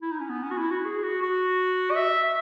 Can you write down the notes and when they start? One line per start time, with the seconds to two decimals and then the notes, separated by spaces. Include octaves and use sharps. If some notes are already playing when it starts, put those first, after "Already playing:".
0.02 E4
0.11 D#4
0.20 C#4
0.29 B3
0.43 C#4
0.51 F#4
0.57 E4
0.71 F#4
0.85 G#4
1.03 F#4
1.22 F#4
1.91 D#5
1.96 E5
2.24 E5